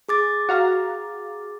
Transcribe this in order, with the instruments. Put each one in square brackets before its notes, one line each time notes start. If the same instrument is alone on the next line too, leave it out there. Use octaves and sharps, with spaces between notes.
[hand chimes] G#4 D6 A6
[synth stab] F#4 F5 A#5